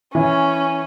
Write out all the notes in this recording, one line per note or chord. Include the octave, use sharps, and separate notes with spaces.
E3 C#4